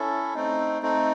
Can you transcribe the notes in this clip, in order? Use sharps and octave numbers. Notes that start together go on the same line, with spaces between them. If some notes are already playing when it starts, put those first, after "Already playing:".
Already playing: C#4 E4 A4
A3 C4 D#4
A3 C4 D#4